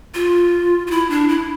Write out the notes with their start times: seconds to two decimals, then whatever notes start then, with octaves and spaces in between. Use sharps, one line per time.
0.15 F4
0.87 F4
0.91 E4
1.10 D4
1.29 E4